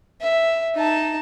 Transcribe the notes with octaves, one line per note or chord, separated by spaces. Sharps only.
E5
D#4 A5